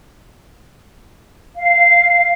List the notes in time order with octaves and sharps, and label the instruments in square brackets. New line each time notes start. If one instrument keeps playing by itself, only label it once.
[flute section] F5